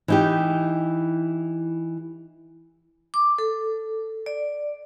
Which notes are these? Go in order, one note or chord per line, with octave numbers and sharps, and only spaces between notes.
E3 D#4 G4
D6
A4
D5